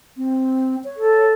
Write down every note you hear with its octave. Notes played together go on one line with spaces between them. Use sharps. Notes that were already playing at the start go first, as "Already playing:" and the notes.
C4
C#5
A4